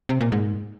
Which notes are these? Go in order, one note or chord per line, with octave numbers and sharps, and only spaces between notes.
C3
A#2
G#2